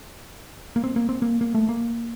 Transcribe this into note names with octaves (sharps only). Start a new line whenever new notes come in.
A#3
C4
A#3
C4
A#3
A#3
A3
A#3